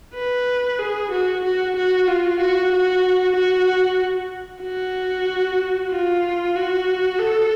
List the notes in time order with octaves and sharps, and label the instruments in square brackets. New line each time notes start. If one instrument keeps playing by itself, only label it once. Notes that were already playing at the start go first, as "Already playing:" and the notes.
[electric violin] B4
G#4
F#4
F#4
F#4
F4
F#4
F#4
F#4
F#4
F4
F#4
A4